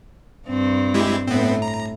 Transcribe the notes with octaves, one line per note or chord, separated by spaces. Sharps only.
G2 C4
G#3 E4 G4
A2 B3 C4
A#5